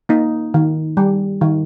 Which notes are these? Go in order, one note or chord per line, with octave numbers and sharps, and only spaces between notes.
A#3 D#4
D#3
G3
D#3